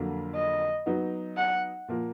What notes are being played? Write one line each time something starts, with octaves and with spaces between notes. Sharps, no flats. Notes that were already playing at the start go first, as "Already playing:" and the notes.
Already playing: F2 D3 F#3 A#3
D#5
F#3 B3 D#4
F#5
A#2 F3 A#3